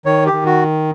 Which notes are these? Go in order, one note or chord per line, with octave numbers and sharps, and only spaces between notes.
D#3 C#5
G4
D#3
F#4